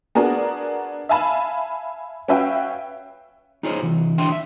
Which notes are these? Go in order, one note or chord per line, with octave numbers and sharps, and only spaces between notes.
B3 D4 F#4 G#4 A#4
E5 F5 G#5 A5 B5
C#4 F#4 B4 E5 F5 G5
D#4 F4 G#4 C5 C#5
C2 E3
D2 E3 D4 E5 G5 C6
E5